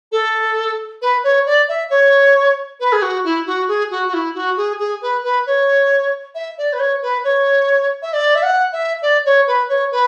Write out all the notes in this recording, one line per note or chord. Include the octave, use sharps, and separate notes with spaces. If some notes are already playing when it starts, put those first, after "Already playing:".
A4
B4
C#5
D5
E5
C#5
B4
G#4
F#4
E4
F#4
G#4
F#4
F#4
E4
F#4
G#4
G#4
B4
B4
C#5
E5
D5
B4
C#5
B4
C#5
E5
D5
E5
F#5
E5
D5
C#5
B4
C#5
B4